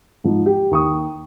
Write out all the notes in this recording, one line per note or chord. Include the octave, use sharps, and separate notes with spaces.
G#2 F3
G4
D#2 C#6 D#6